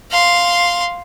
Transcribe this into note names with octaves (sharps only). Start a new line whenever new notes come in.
F5 C6